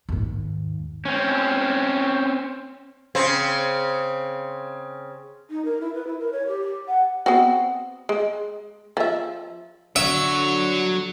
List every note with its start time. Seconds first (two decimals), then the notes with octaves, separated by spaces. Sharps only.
0.09 D#2 G#2
1.05 C4 C#4
3.15 C#3 C4
5.48 D#4
5.65 A#4
5.81 E4
5.94 B4
6.07 E4
6.20 A#4
6.33 C#5
6.48 G4
6.88 F#5
7.26 B3 C4 F#4
8.09 G#3
8.97 F3 E5
9.96 D3 F#3 C#5 E5